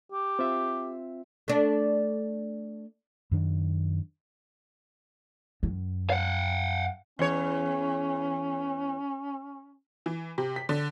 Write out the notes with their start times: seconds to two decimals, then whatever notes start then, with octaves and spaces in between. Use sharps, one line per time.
0.12 G4
0.39 C4 F4 E5
1.48 A3 D4
3.31 F#2 D#3 D4
5.63 F#2
6.10 F5 F#5
7.19 E2 C#4 C#5
10.06 E3
10.38 C3
10.56 B6
10.69 D3